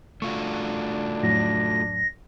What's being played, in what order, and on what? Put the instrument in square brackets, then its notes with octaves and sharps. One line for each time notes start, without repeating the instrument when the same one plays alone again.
[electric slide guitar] A3 F4 F#4 [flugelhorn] D4 [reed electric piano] C#6
[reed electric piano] F2 A2 F#3 [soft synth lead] A#6